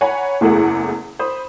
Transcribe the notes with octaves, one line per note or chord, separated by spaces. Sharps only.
C#5 F#5 G#5 A#5 B5
F#1 E2 A3 E4 G#4 F#5
C5 B5 D#6